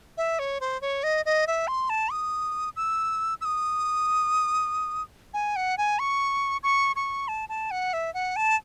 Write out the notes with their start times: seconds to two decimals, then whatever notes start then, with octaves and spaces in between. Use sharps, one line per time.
0.17 E5
0.39 C#5
0.60 C5
0.81 C#5
1.03 D#5
1.25 D#5
1.47 E5
1.67 C6
1.89 A5
2.11 D#6
2.76 E6
3.41 E6
3.45 D#6
5.34 G#5
5.56 F#5
5.78 G#5
5.99 C#6
6.63 C#6
6.96 C#6
7.28 A5
7.49 A5
7.71 F#5
7.93 E5
8.14 F#5
8.36 A5